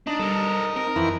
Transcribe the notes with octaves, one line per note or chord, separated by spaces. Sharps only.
D4 D#4
G3 A4 A#4
C4 A#4
F2 E3 E4